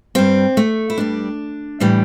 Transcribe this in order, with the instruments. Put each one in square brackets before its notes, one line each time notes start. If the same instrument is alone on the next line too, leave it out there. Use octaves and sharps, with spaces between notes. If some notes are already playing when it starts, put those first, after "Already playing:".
[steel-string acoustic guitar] G2 G3 C4
A3
E4
G2 G3 D4
A2 E3 G3